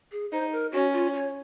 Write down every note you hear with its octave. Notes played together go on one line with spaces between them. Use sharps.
G#4
D#4 C5
A#4
C#4 F#4
F4
C#5